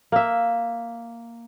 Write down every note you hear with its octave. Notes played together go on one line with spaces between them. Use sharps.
A#3 E5